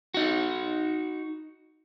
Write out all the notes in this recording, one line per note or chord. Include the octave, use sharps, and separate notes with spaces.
D#4 F#4